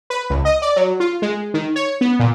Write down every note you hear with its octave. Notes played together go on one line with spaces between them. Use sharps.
B4
C#2
D#5
D5
F#3
F4
G#3
D#3
C#5
B3
A#2